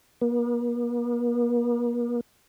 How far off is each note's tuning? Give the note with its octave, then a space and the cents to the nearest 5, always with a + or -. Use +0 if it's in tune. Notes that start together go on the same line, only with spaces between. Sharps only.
A#3 +45